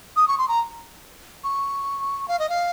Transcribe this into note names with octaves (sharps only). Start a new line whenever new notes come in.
D#6
C#6
C6
A#5
C#6
F5
D#5
F5